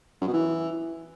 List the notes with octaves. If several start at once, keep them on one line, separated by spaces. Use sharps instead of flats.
F#2
B2
E3